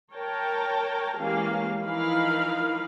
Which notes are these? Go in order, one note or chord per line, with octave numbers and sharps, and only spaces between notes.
A#4 C#5 G5 A5 A#5
E3 G#3 A#3 C#4 G4 F5
E3 F3 D#4 A#4 F5 B5